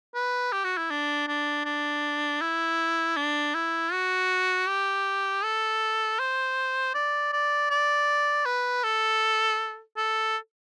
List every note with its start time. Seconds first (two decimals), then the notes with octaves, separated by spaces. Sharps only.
0.15 B4
0.52 G4
0.64 F#4
0.77 E4
0.90 D4
1.28 D4
1.65 D4
2.41 E4
3.16 D4
3.54 E4
3.93 F#4
4.68 G4
5.44 A4
6.19 C5
6.94 D5
7.33 D5
7.70 D5
8.46 B4
8.84 A4
9.97 A4